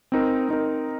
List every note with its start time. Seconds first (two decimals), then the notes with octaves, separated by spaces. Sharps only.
0.12 C4 D#4 A#4
0.49 C4 D#4 A#4